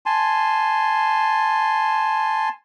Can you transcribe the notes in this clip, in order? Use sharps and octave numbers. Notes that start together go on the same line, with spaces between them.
G#5 A5 C6